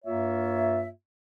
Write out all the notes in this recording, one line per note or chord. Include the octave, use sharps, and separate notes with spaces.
G2 A#3 F4 C#5 E5